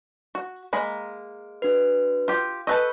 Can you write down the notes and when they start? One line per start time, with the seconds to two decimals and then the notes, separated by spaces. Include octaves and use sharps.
0.35 F#4
0.73 G#3 A#3 B5
1.62 D4 F#4 B4
2.28 F4 G4
2.67 A4 B4 D#5 C#6 E6 G6